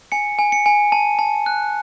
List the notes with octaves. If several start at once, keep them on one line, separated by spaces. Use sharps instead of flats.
G#5 C#7
G#5
C#7
G#5
A5
A5
F#6